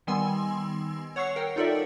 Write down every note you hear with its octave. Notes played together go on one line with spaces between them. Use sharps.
D#3 G3 B3 G#5 C6 E6
C#5 F#5 C#6 E6 C7
A#4 F#5 G5
D#4 F4 A4 A#4 D5 E5